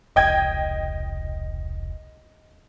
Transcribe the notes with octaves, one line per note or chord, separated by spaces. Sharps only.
E1 C2 D#5 G5 G#6